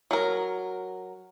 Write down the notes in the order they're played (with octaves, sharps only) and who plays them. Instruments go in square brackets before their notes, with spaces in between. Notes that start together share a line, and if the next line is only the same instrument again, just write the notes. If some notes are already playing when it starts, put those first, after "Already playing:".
[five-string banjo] F#3 A#4